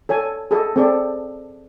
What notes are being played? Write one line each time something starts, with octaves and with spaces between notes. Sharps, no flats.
A4 C#5 G#5
G#4 A4 D#5
C4 G#4 A4 D5